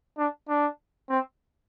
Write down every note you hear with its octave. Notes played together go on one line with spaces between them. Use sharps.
D4
D4
C4